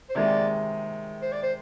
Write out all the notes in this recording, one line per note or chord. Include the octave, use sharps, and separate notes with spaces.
C5
C3 D#3 G#3 D5
C5
D5
C5